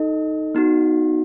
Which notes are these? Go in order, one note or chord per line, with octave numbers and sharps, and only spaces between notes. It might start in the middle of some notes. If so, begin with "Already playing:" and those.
Already playing: D#4 A4 D#5
B3 D#4 F#4